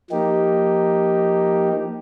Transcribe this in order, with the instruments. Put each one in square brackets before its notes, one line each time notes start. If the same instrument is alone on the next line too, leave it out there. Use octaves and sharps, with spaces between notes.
[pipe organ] F3 A#3 D#4 G4